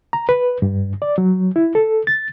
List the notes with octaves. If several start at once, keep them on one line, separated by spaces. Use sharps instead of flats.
A#5
B4
G2
D5
F#3
E4
A4
A6